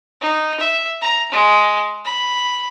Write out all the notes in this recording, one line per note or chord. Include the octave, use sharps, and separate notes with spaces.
D#4
E5
A#5
G#3
B5